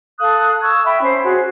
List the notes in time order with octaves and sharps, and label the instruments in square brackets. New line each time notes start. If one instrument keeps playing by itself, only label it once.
[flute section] A4 F5 D#6 F#6
C#6 E6 G#6
E5 G5 B5
C#4 C5
F#4 G#4